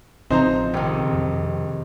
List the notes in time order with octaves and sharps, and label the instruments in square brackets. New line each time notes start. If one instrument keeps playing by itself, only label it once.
[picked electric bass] A1 C#3 F3 [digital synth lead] C4 [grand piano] D#4 C5 A#5
[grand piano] E1 [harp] C3 D#3
[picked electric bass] F2